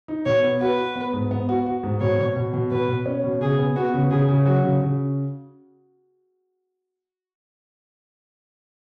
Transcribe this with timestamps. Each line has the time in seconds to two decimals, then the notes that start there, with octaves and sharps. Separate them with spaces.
0.08 D#4
0.26 B2 C#5
0.43 B3
0.61 F#4 B4
0.78 F#4
0.95 B3
1.13 G#2
1.31 B3
1.49 F#4
1.66 F#4
1.83 G#2
2.01 B2 C#5
2.19 B2
2.36 B2
2.54 B2
2.71 B2 B4
2.89 B2
3.06 C#4
3.24 B2
3.41 C#3 G#4
3.59 B3
3.76 B3 F#4
3.94 C#3
4.11 C#3 G#4
4.29 C#3
4.46 F#3 F#4
4.64 C#3
4.81 C#3